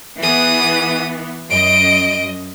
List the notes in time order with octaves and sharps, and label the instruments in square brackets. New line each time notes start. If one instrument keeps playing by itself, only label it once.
[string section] E3 B3 [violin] G#4 D#6
[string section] F#2 D#5 [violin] D7